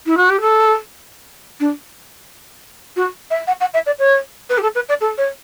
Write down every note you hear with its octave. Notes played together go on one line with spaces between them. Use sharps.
E4
F#4
G4
A4
D4
F#4
E5
F#5
F#5
E5
D5
C#5
B4
G4
A4
B4
D5
A4
C#5